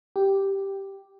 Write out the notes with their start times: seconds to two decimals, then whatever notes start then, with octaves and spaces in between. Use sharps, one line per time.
0.16 G4